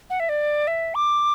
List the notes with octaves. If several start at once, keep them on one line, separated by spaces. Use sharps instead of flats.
F#5
E5
D5
E5
D6